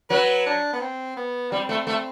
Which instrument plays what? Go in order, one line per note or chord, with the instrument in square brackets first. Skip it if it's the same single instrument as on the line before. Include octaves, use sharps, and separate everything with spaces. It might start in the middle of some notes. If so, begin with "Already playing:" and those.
[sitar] F#3 [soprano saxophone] B4
[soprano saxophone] D4
B3
C4
B3
[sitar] G3 [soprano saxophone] C4
[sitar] A3
A3